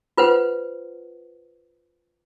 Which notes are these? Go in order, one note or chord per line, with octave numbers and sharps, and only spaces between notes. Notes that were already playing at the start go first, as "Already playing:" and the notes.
F4 B4 C5 F#5